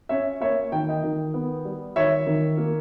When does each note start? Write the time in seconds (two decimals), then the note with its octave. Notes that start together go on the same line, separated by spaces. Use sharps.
0.09 C#4 C#5 E5
0.40 A#3 C#5 E5
0.72 D#3 G5
0.89 D#5 G5
1.03 D#3
1.34 B3
1.65 G3
1.96 D#3 C#5 E5
2.26 D#3
2.57 A#3